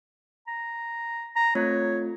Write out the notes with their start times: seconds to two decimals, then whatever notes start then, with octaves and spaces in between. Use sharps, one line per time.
0.47 A#5
1.36 A#5
1.55 A3 C4 F4 C#5